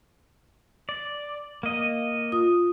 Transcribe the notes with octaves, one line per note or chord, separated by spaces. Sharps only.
D5
A#3 D#5
F4 D#6